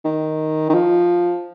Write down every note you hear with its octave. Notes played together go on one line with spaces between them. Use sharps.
D#3
D#3
F3